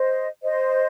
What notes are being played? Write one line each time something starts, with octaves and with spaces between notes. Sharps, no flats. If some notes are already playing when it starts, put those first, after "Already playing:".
Already playing: C5 D#5
C5 D#5